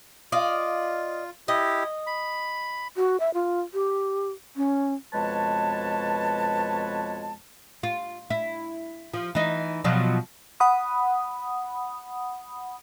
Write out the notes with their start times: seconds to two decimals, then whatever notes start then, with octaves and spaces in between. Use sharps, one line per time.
0.32 F4 D5 D#5 F5
1.48 E4 G4 D#5
2.07 B5
2.96 F#4
3.20 E5
3.34 F4
3.74 G4
4.57 C#4
5.13 F2 B2 G#3 B4 C#5 A5
7.83 F4
8.30 E4
9.14 F3
9.35 E3 D#4
9.84 B2 F3 F#3
10.60 F#5 B5 D#6